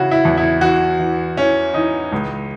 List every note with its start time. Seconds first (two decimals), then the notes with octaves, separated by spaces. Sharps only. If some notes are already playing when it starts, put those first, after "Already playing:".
Already playing: C#3 E3 E4 F#4
0.11 E4
0.25 E2
0.37 E4
0.61 E3 F#4
0.99 E3
1.37 E3 C#4
1.74 E3 D#4
2.12 C#2